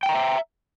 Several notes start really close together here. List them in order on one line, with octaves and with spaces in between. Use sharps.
G5 G#5 A#5 D#5 E5